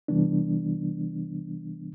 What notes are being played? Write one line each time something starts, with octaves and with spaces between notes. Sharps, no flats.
C3 E3 G3 B3 D4